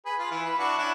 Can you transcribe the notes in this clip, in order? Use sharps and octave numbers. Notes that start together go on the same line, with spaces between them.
G#4 B4
F4
E3
B4
D4 E4 F#4
C#4 D4 E4